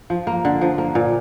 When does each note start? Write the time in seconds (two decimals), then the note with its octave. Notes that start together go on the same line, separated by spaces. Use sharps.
0.10 F3
0.27 A#3
0.45 D3
0.61 F3
0.78 A#3
0.95 A#2